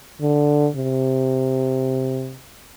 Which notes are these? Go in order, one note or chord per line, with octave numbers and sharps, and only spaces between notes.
D3
C3